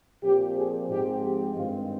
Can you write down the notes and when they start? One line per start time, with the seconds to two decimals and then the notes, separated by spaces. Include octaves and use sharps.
0.23 A#2 F3 C4 G4
0.56 G#4
0.90 G#2 F3 G#3 C4 G4
1.23 G4
1.56 G2 D#3 G#3 C4 F4